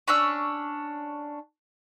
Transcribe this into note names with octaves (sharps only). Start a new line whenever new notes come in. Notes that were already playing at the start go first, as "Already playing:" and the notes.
C#4 D4 C#5 E6